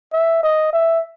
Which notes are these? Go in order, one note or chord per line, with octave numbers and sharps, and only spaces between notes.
E5
D#5
E5